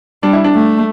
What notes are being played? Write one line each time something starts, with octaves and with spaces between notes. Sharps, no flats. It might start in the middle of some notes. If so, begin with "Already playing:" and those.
G3 D4
E4
D4
A3